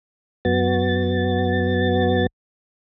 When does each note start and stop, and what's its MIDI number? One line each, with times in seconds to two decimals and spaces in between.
0.45 2.27 42
0.45 2.27 59
0.45 2.27 66
0.45 2.27 93